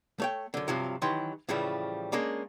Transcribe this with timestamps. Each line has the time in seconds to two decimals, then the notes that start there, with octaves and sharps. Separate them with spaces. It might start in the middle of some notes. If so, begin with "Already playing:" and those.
0.20 A3 C#5 G5
0.54 F#2 D3
0.68 G2 C3 F3 F#3
1.02 D#3 E3 F#3 G4 C6
1.49 A2 C#3 E3 F3 G3
2.12 G#3 A#3 C#4 D4